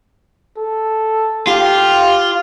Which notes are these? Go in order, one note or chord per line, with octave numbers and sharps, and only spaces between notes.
A4
F4 G4